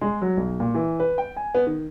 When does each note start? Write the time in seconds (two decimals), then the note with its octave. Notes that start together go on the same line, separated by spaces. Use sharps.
0.01 G#3
0.22 F#3
0.37 B1
0.60 A#2
0.74 E3
1.00 B4
1.18 G5
1.36 G#5
1.55 B3
1.67 D#3